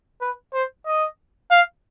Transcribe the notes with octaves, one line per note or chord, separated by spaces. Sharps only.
B4
C5
D#5
F5